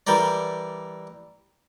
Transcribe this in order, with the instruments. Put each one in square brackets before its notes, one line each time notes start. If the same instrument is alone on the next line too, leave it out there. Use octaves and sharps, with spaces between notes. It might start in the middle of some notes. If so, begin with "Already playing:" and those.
[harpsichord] E3 G3 A#4 D5